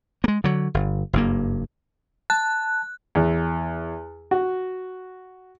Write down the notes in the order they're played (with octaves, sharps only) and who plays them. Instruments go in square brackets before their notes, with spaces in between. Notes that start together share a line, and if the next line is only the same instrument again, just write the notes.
[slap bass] G#3 A#3
D3 F#3
G1
F#1 G2 A#3
[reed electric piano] A5 [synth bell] F#6
[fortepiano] E2
F#4